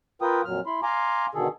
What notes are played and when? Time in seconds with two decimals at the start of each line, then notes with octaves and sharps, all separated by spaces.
0.22 F4 A#4 B4 G5 D#6
0.45 F2 A#2 F#3 F6
0.66 E4 B5 C6
0.83 F5 G#5 A#5 C6 D6
1.34 B2 D3 D#3 G#4 A4